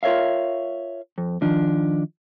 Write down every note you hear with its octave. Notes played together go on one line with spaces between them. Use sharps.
F4 A#4 C#5 E5 F5
F2
D#3 F3 D4